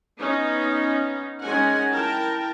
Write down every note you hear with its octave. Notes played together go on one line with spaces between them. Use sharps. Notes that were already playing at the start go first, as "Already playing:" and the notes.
B3 C#4 D#4
G#3 C#4 D#4 A#4 F#5 G#5
E4 A#4 G5 A5